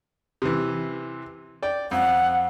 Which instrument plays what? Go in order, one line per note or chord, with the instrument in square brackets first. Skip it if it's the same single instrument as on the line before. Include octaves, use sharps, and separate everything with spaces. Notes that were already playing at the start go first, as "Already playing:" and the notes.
[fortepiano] C3 E3
D5 G5
[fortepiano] F2 [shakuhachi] F#5